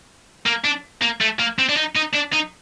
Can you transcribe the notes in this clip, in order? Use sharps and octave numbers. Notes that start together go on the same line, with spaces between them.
A#3
D4
A#3
A3
A#3
C4
D4
D#4
D#4
D4
D#4